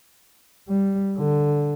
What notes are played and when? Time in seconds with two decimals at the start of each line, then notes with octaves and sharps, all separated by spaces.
0.69 G3
1.18 D3